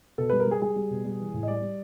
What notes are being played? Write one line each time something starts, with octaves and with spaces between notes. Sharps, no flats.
B2 A4
G3 B4
A#4
G3 G#4
G3 G#4
G3
B2
G3
E3
A2
D#5
G3 D5
G3